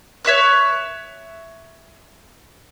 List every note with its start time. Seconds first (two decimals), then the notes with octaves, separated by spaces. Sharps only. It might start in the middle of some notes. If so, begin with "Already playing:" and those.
0.25 C#5 E5 C#6 F#6